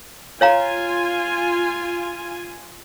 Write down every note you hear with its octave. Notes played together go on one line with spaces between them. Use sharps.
F4 C#5 F5 G#5 A#5